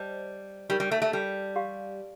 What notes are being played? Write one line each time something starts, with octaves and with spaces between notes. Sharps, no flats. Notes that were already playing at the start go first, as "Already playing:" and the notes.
Already playing: G3 C5 D#5 A5
G3 D#4 G4 A#4
G3
A3
A3
G3
G4 D5 F5 A5 C6